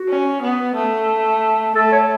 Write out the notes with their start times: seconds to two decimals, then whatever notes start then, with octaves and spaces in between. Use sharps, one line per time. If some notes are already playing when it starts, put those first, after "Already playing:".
Already playing: F#4
0.09 C#4
0.42 B3
0.75 A3
1.75 A3 A4
1.92 C#5